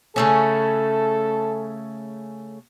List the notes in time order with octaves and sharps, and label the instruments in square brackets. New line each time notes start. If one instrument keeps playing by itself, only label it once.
[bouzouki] C#3 A3 C#4 [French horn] A4